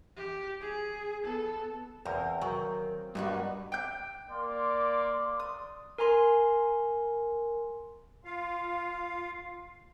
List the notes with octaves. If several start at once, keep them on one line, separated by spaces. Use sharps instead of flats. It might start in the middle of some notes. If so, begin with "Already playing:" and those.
G4
G#4
B3 A4
E2 C4 A#4 F5 G5 G#5
D#3 F#3
G2 A#3 B3 D4 D#4 F#4
G5 G6
A#3 D5 C6
D#6
A#4 G#5 A#5 C6
F4 F5